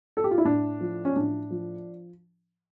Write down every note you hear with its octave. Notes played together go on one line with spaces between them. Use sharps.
A4
G4
F4
E4
A2 D4
F3
C#4
A2 D4
F3